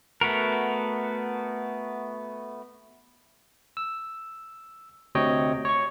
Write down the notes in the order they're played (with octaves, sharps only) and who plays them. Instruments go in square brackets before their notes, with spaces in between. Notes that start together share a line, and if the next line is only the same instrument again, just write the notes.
[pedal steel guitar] A3 B3 F#4 A#4
[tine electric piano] E6
D2 C3 C#5 D#5 G5
C#5 C#6